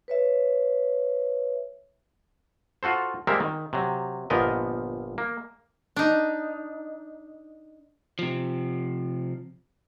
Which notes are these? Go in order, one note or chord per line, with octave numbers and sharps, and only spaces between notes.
B4 C#5 E5
F4 F#4 A4 C5
G3 G#3 A#3 C4 A#4 E5
D#3
C3 F#3
G1 A#2 F3 B3 A#4 D#5
A#3
D4 D#4
C3 F3